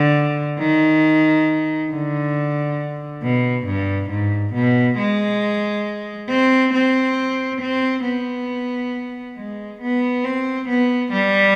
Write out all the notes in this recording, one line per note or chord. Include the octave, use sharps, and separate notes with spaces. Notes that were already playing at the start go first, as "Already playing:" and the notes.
Already playing: D3
D#3
D3
B2
G2
G#2
B2
G#3
C4
C4
C4
B3
G#3
B3
C4
B3
G3